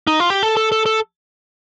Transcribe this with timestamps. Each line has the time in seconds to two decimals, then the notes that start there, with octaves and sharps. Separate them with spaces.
0.07 D#4
0.20 F4
0.30 G4
0.43 A4
0.57 A4
0.72 A4
0.86 A4